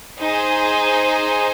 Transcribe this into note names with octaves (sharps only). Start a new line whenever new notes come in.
D#4 G#4 C5